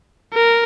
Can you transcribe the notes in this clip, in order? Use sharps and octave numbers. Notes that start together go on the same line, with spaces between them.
A#4